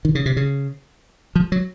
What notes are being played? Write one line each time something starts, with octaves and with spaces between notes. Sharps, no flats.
D#3
C#3
C3
C#3
F3
F#3